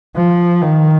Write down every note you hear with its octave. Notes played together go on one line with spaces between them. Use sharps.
F3
D#3